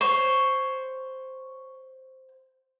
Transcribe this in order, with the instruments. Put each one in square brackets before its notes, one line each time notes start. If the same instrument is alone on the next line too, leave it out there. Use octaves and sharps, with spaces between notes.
[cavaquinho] C5 [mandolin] C#5